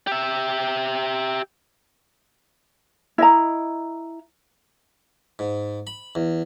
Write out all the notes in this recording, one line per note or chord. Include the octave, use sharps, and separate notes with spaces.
G4 E5
E4 D#5 A#5
G#2
B5
E2